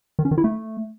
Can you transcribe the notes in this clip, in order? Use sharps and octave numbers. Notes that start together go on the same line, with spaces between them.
D#3
C#4
D#3
E4
A3